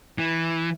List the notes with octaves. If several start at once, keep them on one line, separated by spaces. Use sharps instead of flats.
E3